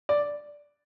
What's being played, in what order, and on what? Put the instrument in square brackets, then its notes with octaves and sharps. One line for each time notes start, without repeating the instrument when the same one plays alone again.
[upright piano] D5